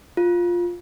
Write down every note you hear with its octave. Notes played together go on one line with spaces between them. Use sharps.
F4